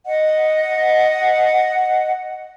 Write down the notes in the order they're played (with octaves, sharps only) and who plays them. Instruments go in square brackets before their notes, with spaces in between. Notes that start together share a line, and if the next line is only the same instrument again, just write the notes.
[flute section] D#5 F#5